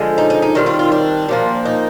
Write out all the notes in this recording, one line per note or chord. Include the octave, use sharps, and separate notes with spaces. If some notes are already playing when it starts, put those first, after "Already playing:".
Already playing: D3 F3 G#3
D#4
D#4
D#4
D#3 G3 C4
F4
F4
D4
A#2 F3 A#3
D#4